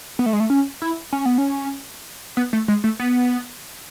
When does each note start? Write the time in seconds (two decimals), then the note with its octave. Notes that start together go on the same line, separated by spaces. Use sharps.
0.19 B3
0.26 A3
0.33 G#3
0.40 A3
0.50 C#4
0.82 E4
1.13 C#4
1.25 B3
1.38 C#4
2.37 B3
2.53 A3
2.68 G#3
2.84 A3
2.99 B3